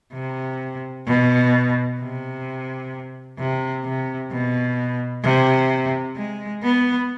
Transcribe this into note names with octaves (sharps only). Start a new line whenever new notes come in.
C3
B2
C3
C3
C3
B2
C3
G#3
B3